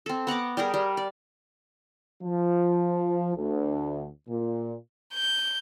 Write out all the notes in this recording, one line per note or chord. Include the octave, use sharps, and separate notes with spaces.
C4 A4
B3 F#5 A#5 D6
G3 G4 G#4 A#4
G3
D5
F3
D2
A#2
G6